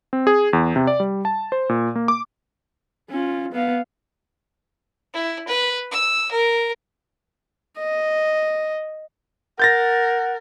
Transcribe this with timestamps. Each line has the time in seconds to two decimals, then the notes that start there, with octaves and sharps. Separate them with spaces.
0.13 C4
0.27 G#4
0.53 E2
0.76 C3
0.87 D5
1.00 G3
1.25 A5
1.52 C5
1.69 A#2
1.95 A#3
2.08 D6
3.10 C#4 F4
3.53 B3 F5
5.14 E4
5.47 B4
5.91 E6
6.31 A#4
7.79 D#5
9.60 A#4 F#5 G6 A6 A#6